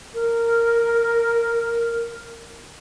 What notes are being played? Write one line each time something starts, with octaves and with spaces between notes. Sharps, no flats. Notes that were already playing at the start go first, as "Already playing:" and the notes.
A#4